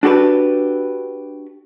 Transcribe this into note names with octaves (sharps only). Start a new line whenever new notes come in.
D4 F#4 G4 A4 B4